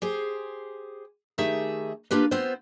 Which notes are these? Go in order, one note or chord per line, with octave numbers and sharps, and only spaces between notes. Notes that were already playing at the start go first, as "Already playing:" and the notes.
G4 G#4 C5
D#3 A3 D#4 G4 G#4 E5
A#3 D4 F4 G4 B4
B3 C4 F4 C5